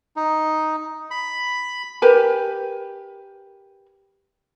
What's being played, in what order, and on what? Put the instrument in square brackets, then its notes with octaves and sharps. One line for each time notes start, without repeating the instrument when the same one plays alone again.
[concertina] D#4
B5
[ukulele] G4 A#4 B4 G#5